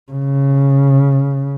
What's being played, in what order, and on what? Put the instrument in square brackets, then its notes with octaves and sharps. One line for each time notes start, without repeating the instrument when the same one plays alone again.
[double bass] C#3